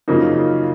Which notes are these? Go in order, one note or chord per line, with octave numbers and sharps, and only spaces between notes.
F#2 C#3 F3 A#3 D#4